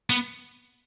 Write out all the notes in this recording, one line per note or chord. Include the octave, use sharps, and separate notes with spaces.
B3